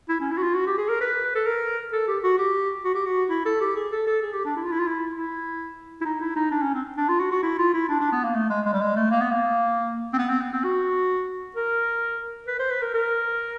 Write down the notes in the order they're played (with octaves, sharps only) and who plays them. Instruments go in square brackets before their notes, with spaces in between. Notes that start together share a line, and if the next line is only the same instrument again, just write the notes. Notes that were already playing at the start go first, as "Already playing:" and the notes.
[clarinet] E4
C#4
E4
F#4
F4
F#4
G4
G#4
A#4
B4
A4
A#4
A4
G4
F#4
G4
F#4
G4
F#4
E4
A4
G4
G#4
A4
A4
G#4
G4
D4
E4
F4
E4
F4
E4
E4
E4
D#4
E4
D#4
D4
C#4
C4
D4
F4
F#4
F#4
E4
F4
E4
D4
D4
B3
A#3
A3
G#3
G#3
G3
G#3
A3
A#3
B3
A#3
C4
B3
C4
B3
C4
F#4
A#4
B4
C5
B4
A#4
A#4